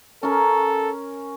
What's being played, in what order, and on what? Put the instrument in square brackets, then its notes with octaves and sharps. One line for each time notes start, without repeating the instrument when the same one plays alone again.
[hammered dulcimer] C#4 A#4 [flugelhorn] A4